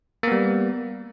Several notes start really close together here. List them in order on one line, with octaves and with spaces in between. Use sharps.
A#3 B3 G3